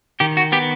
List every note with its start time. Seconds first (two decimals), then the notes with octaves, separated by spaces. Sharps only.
0.20 D#3 G4
0.37 F#4
0.52 B3 G4